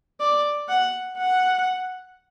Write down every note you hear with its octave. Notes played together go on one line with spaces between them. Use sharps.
D5
F#5
F#5